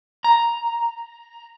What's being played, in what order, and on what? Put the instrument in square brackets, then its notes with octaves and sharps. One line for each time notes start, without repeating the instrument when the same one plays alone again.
[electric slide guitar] A#5